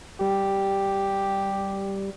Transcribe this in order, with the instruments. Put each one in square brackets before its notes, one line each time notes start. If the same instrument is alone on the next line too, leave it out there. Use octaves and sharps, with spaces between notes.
[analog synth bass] G3 [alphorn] G4